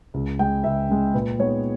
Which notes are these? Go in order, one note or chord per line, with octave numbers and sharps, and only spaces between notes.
C#2
C#3 G#3 G5
C#2 E5
C#3 G#3
A#2 B4
G#3 B3 D#4 C#5